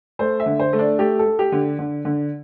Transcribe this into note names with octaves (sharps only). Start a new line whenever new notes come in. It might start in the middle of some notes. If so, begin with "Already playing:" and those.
A3 C5
E5
D3
C5
A3
D4
A3 G4
A4
A3
G4
D3
D3
D3